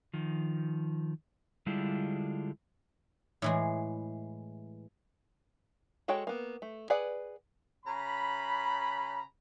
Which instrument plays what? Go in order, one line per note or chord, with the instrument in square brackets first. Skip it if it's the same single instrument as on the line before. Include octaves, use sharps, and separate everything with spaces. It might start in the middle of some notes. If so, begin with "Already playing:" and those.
[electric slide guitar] D#3 F3
D3 G3 G#3 D4 E4 F4
[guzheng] A2 E3 G#3
[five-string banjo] G#3 F#4 A4 C#5 G5
A#3 B3
A3
G#4 B4 D5 F#5
[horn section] C#3 A#5 B5